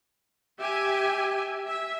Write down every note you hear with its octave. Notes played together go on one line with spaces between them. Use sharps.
G4 E5 G#5
E5